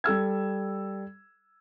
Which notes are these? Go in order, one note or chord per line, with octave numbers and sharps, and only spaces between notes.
G3 A4 E6 G#6